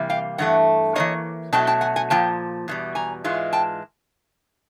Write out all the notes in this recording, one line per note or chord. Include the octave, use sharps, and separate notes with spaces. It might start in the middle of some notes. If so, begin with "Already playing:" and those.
Already playing: C3 E3 G3 A#3
F5 G5
G2 E3 A3 F#5
E3 G3 A#3 C#5 D#5
B2 F#3 A3 G5 A5
G5 A5
F#5 G#5
F#5 G#5
A#2 F3 A#3 G5 A5
E2 B2 G3
G#5 A#5
G#2 E3 G#3 F4
G5 A5